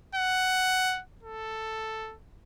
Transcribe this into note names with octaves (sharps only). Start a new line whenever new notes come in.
F#5
A4